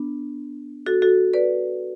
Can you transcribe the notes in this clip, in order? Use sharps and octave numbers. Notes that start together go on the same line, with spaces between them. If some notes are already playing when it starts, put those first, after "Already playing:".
Already playing: B3 D4
F#4 A4
F#4 A4
B4 D5